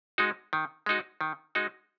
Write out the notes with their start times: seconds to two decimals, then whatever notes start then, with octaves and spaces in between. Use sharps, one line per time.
0.18 G#3 D#4 F#4
0.53 D#3
0.86 G#3 D#4 F#4
1.21 D#3
1.55 G#3 D#4 F#4